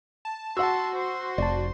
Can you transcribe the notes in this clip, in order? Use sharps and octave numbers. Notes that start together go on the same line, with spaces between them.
A5
F#4 F#5 A5 C6 E6
C5 C6
F1 D5 A5